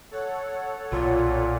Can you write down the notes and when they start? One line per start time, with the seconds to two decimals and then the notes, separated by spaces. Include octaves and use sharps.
0.11 A4 C#5 F#5
0.92 B1 A#2 F4